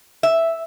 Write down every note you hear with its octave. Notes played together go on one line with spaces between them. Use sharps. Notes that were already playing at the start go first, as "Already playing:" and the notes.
E5